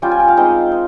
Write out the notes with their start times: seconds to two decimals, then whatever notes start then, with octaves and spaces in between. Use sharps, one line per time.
0.02 G3 C#4 F4 G5
0.11 G#5
0.20 G5
0.28 F5
0.37 G#3 C4 D#4 G5
0.72 D#4